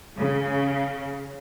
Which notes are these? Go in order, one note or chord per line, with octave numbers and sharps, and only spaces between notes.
C#3